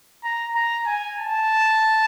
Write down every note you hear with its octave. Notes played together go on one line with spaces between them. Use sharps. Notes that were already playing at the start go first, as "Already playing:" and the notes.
A#5
A#5
G#5
A5